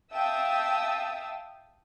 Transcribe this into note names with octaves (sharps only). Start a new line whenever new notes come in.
E5 F5 G5 A5 D#6 E6